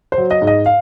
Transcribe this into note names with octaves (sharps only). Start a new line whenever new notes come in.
C5
F#3
D#5
G#2
D#5
F5